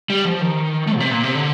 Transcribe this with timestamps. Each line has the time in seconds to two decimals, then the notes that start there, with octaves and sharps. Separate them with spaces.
0.10 G3
0.25 F3
0.41 D#3
0.87 A3
0.96 A#2
1.00 C3
1.11 A#2
1.23 C3
1.35 D3